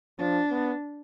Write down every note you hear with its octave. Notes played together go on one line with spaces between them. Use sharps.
F3 D4
B3